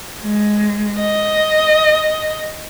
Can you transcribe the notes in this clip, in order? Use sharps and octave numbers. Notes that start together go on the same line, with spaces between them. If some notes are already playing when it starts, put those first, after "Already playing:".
G#3
D#5